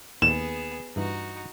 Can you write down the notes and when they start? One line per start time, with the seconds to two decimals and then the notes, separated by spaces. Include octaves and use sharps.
0.22 D#2 B3 G#4 E7
0.96 G2 E3 D#4 F#4